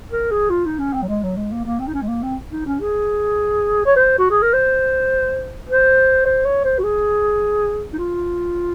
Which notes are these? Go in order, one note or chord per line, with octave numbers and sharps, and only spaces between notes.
A#4
G#4
F4
D#4
C#4
C4
F#3
G#3
F#3
G#3
A#3
A#3
C4
D#4
C#4
G#3
A#3
C4
D#4
C#4
G#4
C#5
C5
F#4
G#4
A#4
C5
C5
C5
C#5
C5
F#4
G#4
D#4
F4